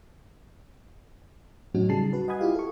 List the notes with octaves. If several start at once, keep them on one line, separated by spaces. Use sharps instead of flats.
A2 F#3 C#4 D#4 F#4
C#3 G3 G#4 A5 C7
F#4 B4
D#5 F#5 G#5 B5 D#6 G#6
E4 F4 G4 F5
A4 C#6